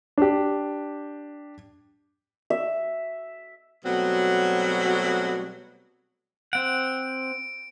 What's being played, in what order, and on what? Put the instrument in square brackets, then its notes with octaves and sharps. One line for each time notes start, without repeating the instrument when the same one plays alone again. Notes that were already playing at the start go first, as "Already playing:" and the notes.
[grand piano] D4 G4
[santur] E5
[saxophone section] B2 F#3 G3 A3 C4 F#4
[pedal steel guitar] C4 F#5 [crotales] D7